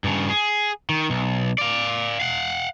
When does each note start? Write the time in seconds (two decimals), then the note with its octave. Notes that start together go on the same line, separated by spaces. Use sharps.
0.04 G2 C#3
0.30 G#4
0.90 D#3
1.10 B1
1.58 D5 F5
2.20 F5 F#5